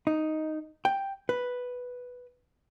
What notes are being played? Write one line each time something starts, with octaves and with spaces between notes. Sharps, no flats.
D#4
G5
B4